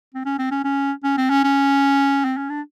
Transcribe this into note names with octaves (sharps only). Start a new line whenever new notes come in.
C4
C#4
C4
C#4
C#4
C#4
C4
C#4
C#4
C4
C#4
D4